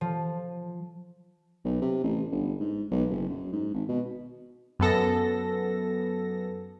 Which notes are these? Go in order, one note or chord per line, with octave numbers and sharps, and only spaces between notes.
F3
B1
C3
A1
G1
G#2
B1
F#1
F#2
G#2
G#1
B2
F#2 B3 A4 A#6